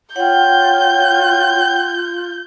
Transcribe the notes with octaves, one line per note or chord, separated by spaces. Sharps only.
F4 C#5 F#5 G5 G6